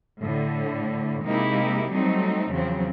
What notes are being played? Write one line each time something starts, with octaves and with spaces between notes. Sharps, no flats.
A2 D3
C3 G#3 A#3 D#4 E4 G4
F#3 G3 A3 C4 D#4
E2 C#3 F3 F#3 C4